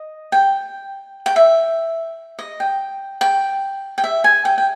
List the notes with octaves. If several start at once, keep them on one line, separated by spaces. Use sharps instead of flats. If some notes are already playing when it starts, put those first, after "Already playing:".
Already playing: D#5
G5
G5
E5
D#5
G5
G5
G5
E5
G#5
G5
G5